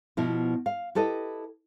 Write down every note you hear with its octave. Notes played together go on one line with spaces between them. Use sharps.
B2 F3 B3 E4
F5
E4 G4 A4 B4 D#5